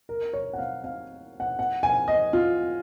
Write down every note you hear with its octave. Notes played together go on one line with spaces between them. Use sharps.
A#4
C#5
F#5
F5
F5
F#5
F#5
G#5
D#5
F4